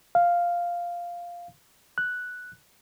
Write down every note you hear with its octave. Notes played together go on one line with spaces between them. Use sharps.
F5
F#6